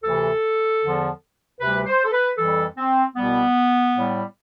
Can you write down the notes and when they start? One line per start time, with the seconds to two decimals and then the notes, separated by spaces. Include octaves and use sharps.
0.04 D2 C3 E3 A4
0.82 E2 D3 F3
1.59 D2 C3 G3 B4
1.86 C5
2.04 A4
2.12 B4
2.38 F2 E3 G3 A4
2.77 C4
3.16 C2 B2 G3 B3
3.95 A2 G3